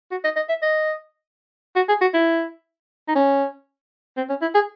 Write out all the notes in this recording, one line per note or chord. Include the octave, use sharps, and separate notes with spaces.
F#4
D#5
D#5
E5
D#5
F#4
G#4
F#4
E4
D#4
C#4
C4
C#4
E4
G#4